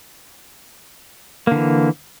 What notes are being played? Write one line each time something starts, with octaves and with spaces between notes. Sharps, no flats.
D3 E3 A#3